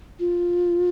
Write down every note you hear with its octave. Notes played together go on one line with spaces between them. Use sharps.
F4